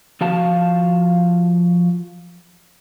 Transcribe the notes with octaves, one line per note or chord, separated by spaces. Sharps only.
F3 F#4 F5 A5